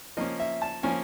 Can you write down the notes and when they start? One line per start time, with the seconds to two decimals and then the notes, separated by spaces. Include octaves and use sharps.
0.17 F3 A#3 C#4 D#5
0.40 E5
0.62 A5
0.83 F3 A#3 C#4 G#5